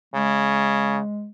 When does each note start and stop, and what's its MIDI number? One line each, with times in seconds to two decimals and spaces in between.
0.14 1.00 49
0.14 1.29 56